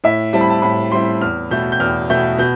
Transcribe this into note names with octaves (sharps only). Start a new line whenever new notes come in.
A2 E5
G3 C4 E4 A5
B5
A5
A2 B5
G3 C4 E4 C6
E2 F6
B2 A3 G6
G6
E2 F6
B2 A3 G6
B2 G6